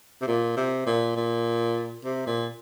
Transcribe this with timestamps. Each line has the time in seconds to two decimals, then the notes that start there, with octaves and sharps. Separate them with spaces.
0.22 C3
0.27 A#2
0.57 C3
0.86 A#2
1.16 A#2
2.05 C3
2.27 A#2